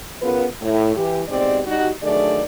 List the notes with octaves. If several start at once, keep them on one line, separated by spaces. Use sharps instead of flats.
C#3 B3 F4 A#4 B4
A2
E3 G4
G#2 B2 C4 G4 D5
G3 D#4 F#4
D#3 F#3 A3 D4 G#4 D5